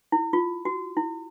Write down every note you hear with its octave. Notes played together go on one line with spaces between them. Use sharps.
E4
F4
F#4
E4